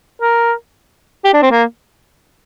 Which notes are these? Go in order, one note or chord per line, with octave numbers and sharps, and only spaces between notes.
A#4
G4
D4
C4
A#3